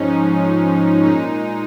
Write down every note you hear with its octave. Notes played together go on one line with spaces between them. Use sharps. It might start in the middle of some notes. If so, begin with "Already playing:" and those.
Already playing: G#2 F3 G#3 C#4 D#4
A#2 G#3 D#4